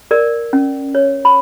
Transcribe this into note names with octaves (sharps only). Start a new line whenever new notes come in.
A#4 D5
C#4
C#5
B5